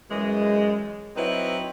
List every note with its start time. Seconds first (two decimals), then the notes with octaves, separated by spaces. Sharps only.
0.10 F#2 E3 G#3
1.16 F#3 C4 D#4 E4 B4